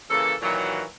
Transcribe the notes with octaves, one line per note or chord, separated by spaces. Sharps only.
C#3 E3 A#3 A4
A#2 D#3 E3 F#3